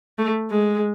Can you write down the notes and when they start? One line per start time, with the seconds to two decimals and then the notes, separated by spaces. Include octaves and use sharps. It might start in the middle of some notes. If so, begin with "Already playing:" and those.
0.19 A3
0.50 G#3